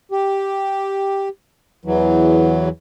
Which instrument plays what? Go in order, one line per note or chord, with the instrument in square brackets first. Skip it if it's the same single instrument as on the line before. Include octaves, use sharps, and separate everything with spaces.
[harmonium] G4
E2 E3 F#3